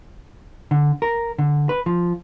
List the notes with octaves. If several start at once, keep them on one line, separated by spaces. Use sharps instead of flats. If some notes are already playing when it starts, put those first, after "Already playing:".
D3
A#4
D3
B4
F3